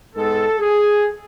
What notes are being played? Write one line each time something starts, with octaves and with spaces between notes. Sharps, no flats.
G#2 G#3 B3 A4
G#4